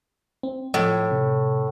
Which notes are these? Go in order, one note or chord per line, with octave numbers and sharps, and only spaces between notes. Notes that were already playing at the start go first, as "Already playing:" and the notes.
C4
A2 F3
C3